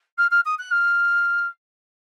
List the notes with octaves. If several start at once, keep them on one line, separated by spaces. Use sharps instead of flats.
F6
F6
D#6
F#6
F6